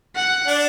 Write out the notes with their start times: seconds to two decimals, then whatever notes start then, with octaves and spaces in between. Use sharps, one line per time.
0.15 F#5
0.47 D4